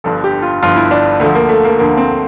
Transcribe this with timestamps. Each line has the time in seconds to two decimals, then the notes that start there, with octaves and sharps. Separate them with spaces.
0.04 G1 G2 F3 A4
0.24 G4
0.42 F4
0.62 G1 G2 F3 F4
0.76 E4
0.91 D4
1.20 D2 D3 F3 A3
1.35 A#3
1.49 A3
1.64 A#3
1.78 D2 D3 F3 A#3
1.97 C4